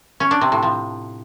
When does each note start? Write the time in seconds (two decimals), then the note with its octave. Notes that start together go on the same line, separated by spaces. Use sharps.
0.20 C#4
0.31 D4
0.41 C3
0.52 A2
0.63 F3